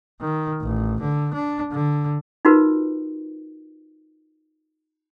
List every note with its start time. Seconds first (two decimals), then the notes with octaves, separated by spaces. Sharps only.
0.21 D#3
0.61 A1
1.01 D3
1.34 D4
1.72 D3
2.45 D#4 F4 F#4 A#4 B4